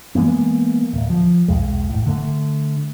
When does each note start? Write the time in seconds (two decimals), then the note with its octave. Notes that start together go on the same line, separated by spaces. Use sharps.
0.15 E3 G#3 A#3 B3
0.93 D1
1.10 F3
1.48 B1 E2 G#3
1.90 G#1 A2
2.06 D3 A3